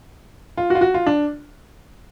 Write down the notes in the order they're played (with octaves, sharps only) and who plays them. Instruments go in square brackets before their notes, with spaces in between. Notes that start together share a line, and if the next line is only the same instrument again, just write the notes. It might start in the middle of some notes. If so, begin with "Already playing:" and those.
[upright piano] F4
F#4
F4
F#4
F4
D4